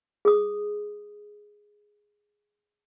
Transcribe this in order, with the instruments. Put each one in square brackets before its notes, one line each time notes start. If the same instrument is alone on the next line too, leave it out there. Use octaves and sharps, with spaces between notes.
[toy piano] G#4 D#6